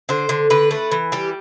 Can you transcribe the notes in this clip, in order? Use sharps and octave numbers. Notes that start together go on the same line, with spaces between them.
D3 C5
D3
D3 B4
A3
E3
G3 G4